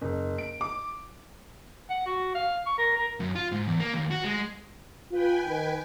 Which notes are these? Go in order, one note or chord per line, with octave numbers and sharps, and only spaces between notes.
F#1
D7
D6
F#5
F#4
F5
C#6
A#4
A#4
F#2
F4
G#2
E2
A#3
D#2
F#4
G#3
F4 B4 G5 G#5
D#3